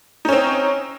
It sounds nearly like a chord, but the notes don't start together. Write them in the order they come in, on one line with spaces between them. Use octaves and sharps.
D#4 C#4 C4